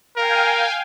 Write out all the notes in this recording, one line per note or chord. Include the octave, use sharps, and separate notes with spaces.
A#4 F5 G5 G#5